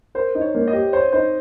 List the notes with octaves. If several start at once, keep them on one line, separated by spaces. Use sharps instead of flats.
A#4 C5
D#4
C#5
A#3
D#5
G4
C5 C#5
D#4 C5